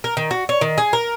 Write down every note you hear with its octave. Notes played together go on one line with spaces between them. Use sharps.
A#4
D#3
F#4
C#5
D#3
G#4
A#4